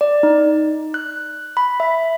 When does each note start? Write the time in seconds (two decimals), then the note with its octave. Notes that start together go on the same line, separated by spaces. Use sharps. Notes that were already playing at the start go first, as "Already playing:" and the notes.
0.01 D5
0.23 D#4
0.94 F#6
1.57 B5
1.80 E5